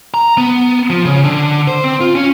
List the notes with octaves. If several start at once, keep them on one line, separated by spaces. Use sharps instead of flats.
A#5
B3
F3
C#3
D3
C5
C4
F4
C#4